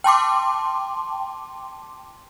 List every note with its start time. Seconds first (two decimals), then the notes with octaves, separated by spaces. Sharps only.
0.04 G5 A5 C6 D6